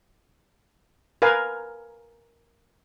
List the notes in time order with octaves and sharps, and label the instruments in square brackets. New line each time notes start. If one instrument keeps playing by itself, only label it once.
[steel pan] A#4 B4 F5 G#5